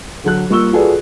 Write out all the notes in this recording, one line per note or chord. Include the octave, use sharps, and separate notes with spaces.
D3 F#3 A4 F#6
G3 A#3 F4 C#6 E6 G7
F4 F#4 G#4 A4 B4 D5